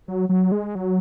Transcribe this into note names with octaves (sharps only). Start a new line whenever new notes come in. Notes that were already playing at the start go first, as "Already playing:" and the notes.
F#3
F#3
G#3
F#3